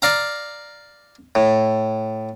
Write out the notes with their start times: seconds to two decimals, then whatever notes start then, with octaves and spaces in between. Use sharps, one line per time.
0.02 D5 F5 A#5
1.35 A2